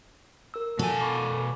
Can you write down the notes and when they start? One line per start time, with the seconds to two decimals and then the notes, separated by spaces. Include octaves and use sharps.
0.54 A#4 E6
0.79 B2 A4 G#5
1.01 B5 C#6 D6